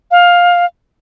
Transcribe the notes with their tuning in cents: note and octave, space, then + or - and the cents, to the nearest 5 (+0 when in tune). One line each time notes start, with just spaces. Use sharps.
F5 +15